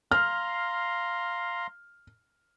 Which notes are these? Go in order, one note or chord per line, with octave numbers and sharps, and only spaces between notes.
F5 A#5 C6 F6